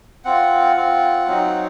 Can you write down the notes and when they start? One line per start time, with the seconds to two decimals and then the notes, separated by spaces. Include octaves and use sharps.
0.25 C4 F4 F#5
0.76 C4 F4
1.27 F#3 C4 D#4